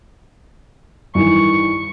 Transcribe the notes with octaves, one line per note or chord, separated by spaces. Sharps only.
G2 D#3 E3 C#6